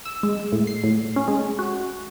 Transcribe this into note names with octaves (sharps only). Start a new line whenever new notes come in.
E6
G#3
A2
C7
A2
C#4
G#3
F#4